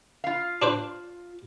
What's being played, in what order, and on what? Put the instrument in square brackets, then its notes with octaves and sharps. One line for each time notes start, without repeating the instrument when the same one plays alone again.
[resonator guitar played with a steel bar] F4 F5
[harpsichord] D4 B4 C5